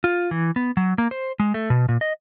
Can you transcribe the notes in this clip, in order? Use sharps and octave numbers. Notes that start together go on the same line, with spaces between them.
F4
E3
B3
F#3
A#3
C5
G#3
A3
B2
A#2
D#5